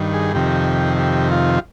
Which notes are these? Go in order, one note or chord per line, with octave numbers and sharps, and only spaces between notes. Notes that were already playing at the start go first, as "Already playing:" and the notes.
Already playing: G2 D#3
G#4
F2 C3 D#3 G4
G4
F4